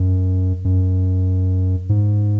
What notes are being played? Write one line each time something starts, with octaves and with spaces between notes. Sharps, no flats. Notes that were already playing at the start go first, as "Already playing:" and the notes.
Already playing: F#2
F#2
G#2